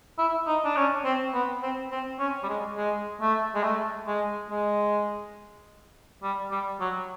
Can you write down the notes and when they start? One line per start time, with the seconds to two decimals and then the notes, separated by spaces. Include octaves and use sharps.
0.18 E4
0.47 D#4
0.65 D4
0.76 C#4
1.05 C4
1.34 B3
1.62 C4
1.91 C4
2.19 C#4
2.43 G3
2.49 G#3
2.77 G#3
3.21 A3
3.55 G#3
3.63 A3
4.07 G#3
4.50 G#3
6.23 G3
6.51 G3
6.80 F#3